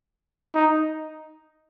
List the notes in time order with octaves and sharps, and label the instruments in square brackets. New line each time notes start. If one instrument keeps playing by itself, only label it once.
[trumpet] D#4